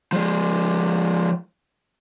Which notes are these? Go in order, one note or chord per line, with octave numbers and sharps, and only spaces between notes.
F3 G#3